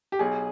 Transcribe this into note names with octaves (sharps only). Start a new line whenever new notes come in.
G4
B1 G#4